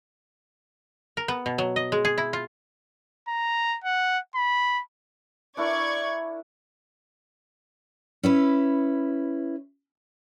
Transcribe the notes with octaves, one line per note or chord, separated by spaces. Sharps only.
A#4
B3
B2
F#3
D#5
G#3
G#4
E4
F4
A#5
F#5
B5
D4 E4 A#4 D5 C#6 G#6
C#4 E4 B4